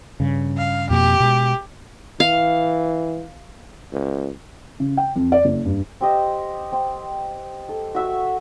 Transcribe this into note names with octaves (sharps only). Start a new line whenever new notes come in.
G2 C#3
F5
F2 B2 A#3 G4
B2 G#3
E3 F5
C#2
C#3
G5
F2
D5
F#1
G2
C4 G4 D#5
C4
A4
F#4 E5 C#6